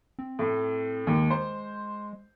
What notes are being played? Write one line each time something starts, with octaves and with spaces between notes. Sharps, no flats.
C4
A2
D#2 G#3
C5